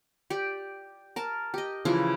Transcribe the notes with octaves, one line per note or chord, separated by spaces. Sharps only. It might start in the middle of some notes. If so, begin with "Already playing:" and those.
G4 D5
A#4 A5
G4 D#5
C#3 E3 F3 E4